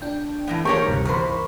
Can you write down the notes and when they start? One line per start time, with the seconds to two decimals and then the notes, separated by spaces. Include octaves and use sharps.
0.02 D4 G5
0.47 A2 E3 B3
0.65 G4 A#4 C#5 C#6
0.87 D2 G2 C3
1.05 E2 A#4 C5 B5